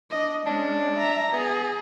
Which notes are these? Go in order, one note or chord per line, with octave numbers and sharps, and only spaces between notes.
D4 D#5
G#3 C#4 D4
E5 A#5
B3 G#4